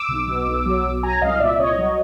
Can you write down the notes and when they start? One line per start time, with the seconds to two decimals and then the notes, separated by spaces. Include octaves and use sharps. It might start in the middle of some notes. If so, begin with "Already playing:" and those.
Already playing: D6 E6
0.08 B1
0.28 B2
0.46 B1
0.66 F#3
0.85 B1
1.03 F#3 G#5 A#5
1.21 C2 D#5 F5
1.40 A#2 D5 E5
1.59 C2 C#5 D#5
1.79 F#3